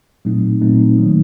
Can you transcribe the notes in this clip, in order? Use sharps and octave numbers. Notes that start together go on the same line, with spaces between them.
A#2 F#3 A3 C4 D#4
A#2 F#3 A3 C4 D#4
D#3 F#3 A#3